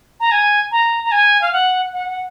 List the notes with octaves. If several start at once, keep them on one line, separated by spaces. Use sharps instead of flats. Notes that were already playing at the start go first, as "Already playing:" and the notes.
A#5
G#5
A#5
A#5
G#5
F5
F#5
F#5
F#5